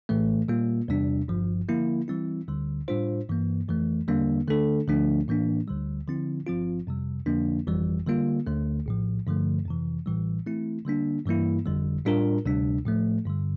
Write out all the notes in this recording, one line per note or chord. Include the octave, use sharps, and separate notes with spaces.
A#1 A2 E3 A3
A#2 G3 A#3 F4
E2 C3 G3 D4
G1 G2 F3
D3 F3 A#3 E4
E3 G3 C4 E4
D2 D3 G3
A2 G3 D4 F4 C5
G2 E3 A#3
F2 E3 A3
E2 D3 G3 A#3 D4
D3 A3 D4 A4
D2 D3 F3 A3 D4
A2 E3 A#3 D4
D2 D3 G3
D3 F3 C4 E4
G1 G2 F3 C4 F4
F2 C3 G3
F2 D3 F3 A#3 D4
G1 F2 E3 G3
D3 G3 A#3 F4
D2 D3 A3
A#1 A2 F3
G2 D3 F3 A3
F2 C3 E3
A1 A2 E3 G3
E3 A3 C4 E4
D3 G3 A#3 D4
G2 E3 G3 A#3 E4
G1 F2 D3 G3
A2 G3 D4 F4 A#4
D2 C3 G3 D4
A2 F3 A3
G2 D3 G3